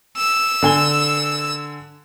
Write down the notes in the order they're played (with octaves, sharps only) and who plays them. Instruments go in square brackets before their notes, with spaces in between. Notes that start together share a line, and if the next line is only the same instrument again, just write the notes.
[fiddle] E6
[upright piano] D3 G#5 G7